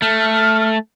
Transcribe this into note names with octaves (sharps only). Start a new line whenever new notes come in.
A3 F6